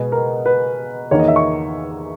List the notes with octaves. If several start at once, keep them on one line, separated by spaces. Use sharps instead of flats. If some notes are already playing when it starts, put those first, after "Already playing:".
Already playing: B2 G#3 B3 G#4
A#4
B4
E2 D#3 A#3 C#5
D#5
E5
C#6